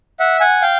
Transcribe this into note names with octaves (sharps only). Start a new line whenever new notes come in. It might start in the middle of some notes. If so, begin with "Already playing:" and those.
E5 F#5
F#5 G#5
F5 G5